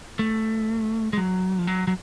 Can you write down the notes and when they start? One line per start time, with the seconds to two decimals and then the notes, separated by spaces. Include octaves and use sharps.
0.19 A3
1.13 G#3
1.17 F#3
1.59 F3
1.67 F#3
1.87 F#3